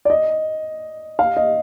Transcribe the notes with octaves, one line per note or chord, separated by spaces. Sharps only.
D5
D#5
F5
D#5